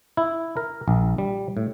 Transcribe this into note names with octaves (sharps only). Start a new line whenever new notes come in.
E4
A#4
A#1
G3
A2